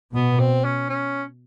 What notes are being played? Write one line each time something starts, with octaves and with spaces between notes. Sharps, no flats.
B2 B3
C4
C#4
C#4